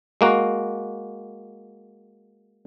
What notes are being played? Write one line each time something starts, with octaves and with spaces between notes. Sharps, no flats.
G#3 A#3 F#4